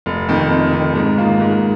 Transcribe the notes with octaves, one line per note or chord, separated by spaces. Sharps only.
F1
F2 D#3
F1
F2 D#3
G#2
D#3 A#3 F4
G#2